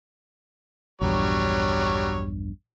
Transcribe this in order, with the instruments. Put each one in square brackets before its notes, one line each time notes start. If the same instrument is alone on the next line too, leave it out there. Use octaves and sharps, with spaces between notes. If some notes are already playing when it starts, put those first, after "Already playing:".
[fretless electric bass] A#1 E2 G2 [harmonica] F#3 G3 C#5